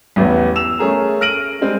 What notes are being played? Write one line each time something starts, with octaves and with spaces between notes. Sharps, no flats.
A1 E2 B3
E6 E7 F7
A3 C#4 G#4 A#4
F6 A#6 D7 D#7 F#7
G3 G#3 C4